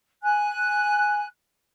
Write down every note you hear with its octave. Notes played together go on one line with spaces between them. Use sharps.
G#5 F#6